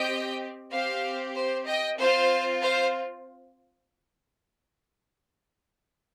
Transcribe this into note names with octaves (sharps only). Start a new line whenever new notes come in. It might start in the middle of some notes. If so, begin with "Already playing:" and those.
Already playing: C4 G4 D#5 G5
C4 G4 C5 F5
C5
D#5 G5
C4 F4 C5 F5
C5 F5